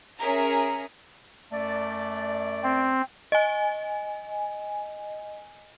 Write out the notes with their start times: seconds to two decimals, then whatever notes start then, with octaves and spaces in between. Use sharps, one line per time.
0.19 C#4 G#4 A#4 E5 A#5
1.52 F#2 A3 D5
2.64 C4
3.32 D#5 G#5